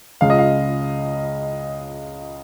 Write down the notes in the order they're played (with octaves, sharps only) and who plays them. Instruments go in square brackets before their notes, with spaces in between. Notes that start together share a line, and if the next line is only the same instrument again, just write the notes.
[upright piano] C#2 C#3 G#3 F4 F5
D#5
F5